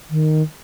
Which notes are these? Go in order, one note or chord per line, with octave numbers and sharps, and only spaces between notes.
D#3